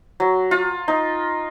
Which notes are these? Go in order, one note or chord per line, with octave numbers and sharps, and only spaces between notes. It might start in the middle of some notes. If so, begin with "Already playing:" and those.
F#3
F4
D#4